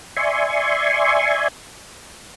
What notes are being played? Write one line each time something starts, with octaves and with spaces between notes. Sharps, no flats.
D5 E5 G#5 C6 C#6